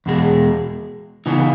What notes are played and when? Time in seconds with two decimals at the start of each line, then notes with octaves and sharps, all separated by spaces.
0.06 E2 B2 G#3
1.26 C#3 E3 B3 D#4